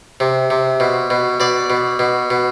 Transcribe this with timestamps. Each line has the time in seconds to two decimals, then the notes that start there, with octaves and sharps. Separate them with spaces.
0.20 C3
0.50 C3
0.80 B2
1.10 B2
1.40 B2 D5
1.70 B2
1.99 B2
2.30 B2